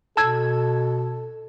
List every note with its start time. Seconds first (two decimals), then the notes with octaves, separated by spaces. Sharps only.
0.17 B2 A4 A5 E6 G#6